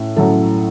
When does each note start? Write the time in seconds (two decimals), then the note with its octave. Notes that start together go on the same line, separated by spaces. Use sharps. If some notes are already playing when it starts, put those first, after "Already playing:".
Already playing: A2 A3 C#4
0.16 A2 F#3 A3 C#4 A4